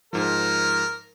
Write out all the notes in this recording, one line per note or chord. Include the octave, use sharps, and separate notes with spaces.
G#2 F3 A#4